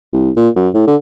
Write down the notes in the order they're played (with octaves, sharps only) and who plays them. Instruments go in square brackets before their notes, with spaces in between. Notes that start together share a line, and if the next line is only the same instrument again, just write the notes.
[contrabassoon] C2
A#2
F#2
A2
D3